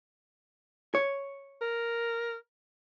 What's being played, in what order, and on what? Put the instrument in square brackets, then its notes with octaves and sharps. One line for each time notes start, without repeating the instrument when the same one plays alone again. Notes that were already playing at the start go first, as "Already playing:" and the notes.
[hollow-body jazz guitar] C#5
[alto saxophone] A#4